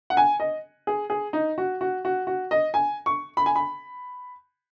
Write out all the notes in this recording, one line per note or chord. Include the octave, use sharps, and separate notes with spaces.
F#5
G#5
D#5
G#4
G#4
D#4
F#4
F#4
F#4
F#4
D#5
G#5
C#6
B5
G#5
B5